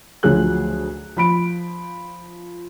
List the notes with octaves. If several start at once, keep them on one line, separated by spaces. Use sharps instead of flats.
D2 F3 F#3 G#4 F#6
F3 B5 D7